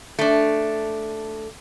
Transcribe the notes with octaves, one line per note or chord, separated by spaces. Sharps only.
A3 D4